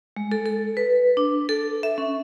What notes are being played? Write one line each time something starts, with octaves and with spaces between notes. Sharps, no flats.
G#3
A4
A4
B4
D4
A4
E5
C#4